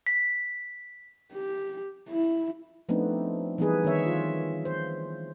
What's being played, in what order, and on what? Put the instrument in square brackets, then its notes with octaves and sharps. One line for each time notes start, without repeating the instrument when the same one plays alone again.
[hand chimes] B6
[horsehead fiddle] G4
E4
[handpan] F3 A3 B3 C4 D4 D#4
E3 G3 B3 D#4 G#4 B4
D#3 B3 C#5 E5
F4
C5